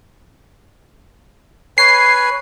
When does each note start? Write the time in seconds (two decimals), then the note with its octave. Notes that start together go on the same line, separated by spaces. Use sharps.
1.78 B4 C#5 G#5 C7